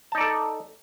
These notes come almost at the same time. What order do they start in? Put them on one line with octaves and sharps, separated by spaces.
A5 D#4 D5 A4